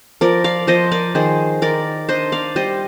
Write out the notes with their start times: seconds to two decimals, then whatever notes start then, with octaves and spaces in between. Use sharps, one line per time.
0.21 F3 A#4 D5
0.44 D5 F5
0.67 F3 C5 D#5
0.92 A#4 D5
1.15 D#3 G#4 C5
1.62 D#3 A#4 D5
2.09 D4 C5 D#5
2.32 D5 F5
2.56 G3 C5 D#5